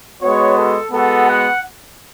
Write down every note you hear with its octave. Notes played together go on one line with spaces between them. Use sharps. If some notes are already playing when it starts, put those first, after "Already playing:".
G#3 B3 F#4 C#5
A4
G#3 B3 F#4 A4
F#5